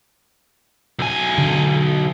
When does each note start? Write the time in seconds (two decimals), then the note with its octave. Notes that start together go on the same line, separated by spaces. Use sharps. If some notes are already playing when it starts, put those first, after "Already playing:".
0.99 B1 G#5
1.38 D3